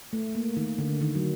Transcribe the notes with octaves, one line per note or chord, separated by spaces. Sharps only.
A3
A#3
D#3
D3
D#3
F#3